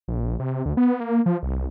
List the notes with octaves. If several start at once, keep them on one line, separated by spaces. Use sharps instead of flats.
A#1
C3
D2
B3
A#3
F3
C2